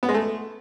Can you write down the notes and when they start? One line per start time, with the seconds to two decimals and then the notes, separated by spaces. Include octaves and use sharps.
0.03 B3
0.09 G#3
0.14 A3